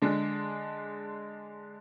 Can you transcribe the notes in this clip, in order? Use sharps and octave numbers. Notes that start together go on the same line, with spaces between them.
D3 G#3 D4